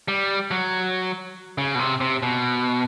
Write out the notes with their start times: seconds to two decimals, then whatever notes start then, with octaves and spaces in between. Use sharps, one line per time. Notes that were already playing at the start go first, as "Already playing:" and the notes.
0.08 G3
0.51 F#3
1.58 C#3
1.75 B2
1.79 C3
2.01 C3
2.23 B2